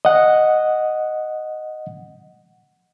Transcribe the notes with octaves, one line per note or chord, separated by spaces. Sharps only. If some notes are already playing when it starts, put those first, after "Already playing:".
D#5 F#5